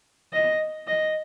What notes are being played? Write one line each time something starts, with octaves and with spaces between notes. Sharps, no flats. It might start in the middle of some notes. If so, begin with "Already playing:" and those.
D#5
D#5